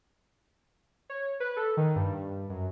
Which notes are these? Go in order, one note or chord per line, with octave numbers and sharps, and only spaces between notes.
C#5
B4
A4
D#3
G2
F#2